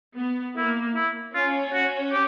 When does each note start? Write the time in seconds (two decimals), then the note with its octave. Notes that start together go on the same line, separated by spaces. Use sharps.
0.17 B3
0.57 A#3 E4
0.96 E4
1.35 C#4 F4
1.74 F#4
2.13 G4